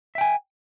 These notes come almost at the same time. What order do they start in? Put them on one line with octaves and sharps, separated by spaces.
E5 G5 G#5